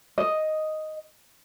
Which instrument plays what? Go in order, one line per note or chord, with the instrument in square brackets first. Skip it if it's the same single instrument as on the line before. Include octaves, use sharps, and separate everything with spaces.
[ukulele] D#5